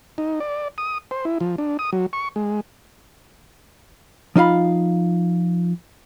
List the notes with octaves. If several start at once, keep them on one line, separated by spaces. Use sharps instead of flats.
D#4
D5
D#6
C5
E4
F3
D4
D#6
F#3
C#6
G#3
F3 D#4 F4 F5 B5